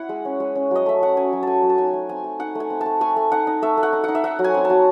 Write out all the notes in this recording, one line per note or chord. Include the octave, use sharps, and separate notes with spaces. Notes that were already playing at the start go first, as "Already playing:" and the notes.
Already playing: E4 F#5
G#3
C#4
G#3
C#4
F#3 D#5
A3 E5
F#3 F#5
C#4 G#5
F#3
A3 G#5 A5
F#3
A5
D#4 G#5
A3
C4 G#5
A3
D#4 F#5
A3 G#5
C4
A5
A3
A3 G#5
A3
D#4 F#5
D#4
A3 E5
A3
F#5
D#4
D#4 F#5
E5
D#4 F#5
F#3
G#5
C4
A5
F#3